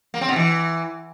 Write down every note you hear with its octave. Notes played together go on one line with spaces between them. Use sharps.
A#3
C4
B2
E3